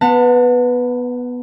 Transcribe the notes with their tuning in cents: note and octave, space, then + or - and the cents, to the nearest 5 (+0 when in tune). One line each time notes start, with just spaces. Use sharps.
B3 +0 F#5 -30 A5 +35